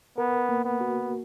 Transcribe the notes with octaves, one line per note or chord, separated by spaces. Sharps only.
B3 A#4
A#3
B3
F#4